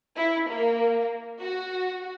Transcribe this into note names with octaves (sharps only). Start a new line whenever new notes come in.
E4
A#3
F#4